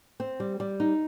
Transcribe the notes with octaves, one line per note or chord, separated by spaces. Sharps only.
C4
G3
G3
D#4